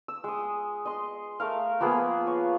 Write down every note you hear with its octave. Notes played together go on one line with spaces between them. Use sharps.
E6
G#3 D#6
D#5 C6
A3 A#4 F5
F3 A#3 B3 G#4
C#5